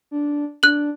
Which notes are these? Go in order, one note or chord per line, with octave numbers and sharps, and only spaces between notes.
D4
D4 F#6 F#7